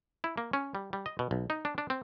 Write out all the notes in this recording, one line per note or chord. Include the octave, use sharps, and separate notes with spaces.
E4
A#3
C#4
G3
G3
D#5
B2
B1
D#4
D4
D4
C4